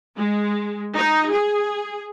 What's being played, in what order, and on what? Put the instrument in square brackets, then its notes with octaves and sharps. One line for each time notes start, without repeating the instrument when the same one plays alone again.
[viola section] G#3
D#4
G#4